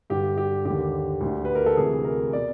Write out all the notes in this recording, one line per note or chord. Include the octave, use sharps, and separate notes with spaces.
G2 D3 G4
G4
D#2 D3 G4
D2 D3
B4
A#4
A4
D2 C3 E3 G#4
A#4
B2 D5